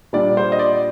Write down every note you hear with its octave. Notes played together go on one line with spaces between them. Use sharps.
A#2 G3 D4 D5
C5
D#5
D5